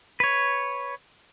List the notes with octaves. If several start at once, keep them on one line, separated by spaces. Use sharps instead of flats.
B4 C#5